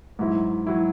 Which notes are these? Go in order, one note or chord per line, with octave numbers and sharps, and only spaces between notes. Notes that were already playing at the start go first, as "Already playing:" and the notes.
G#2 F#3 E4
F#3 E4